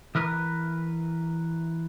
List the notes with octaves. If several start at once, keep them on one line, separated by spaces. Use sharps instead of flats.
E3 A#4 B4